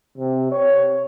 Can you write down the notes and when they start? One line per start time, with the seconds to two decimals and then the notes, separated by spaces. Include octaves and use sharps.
0.18 C3
0.51 C#5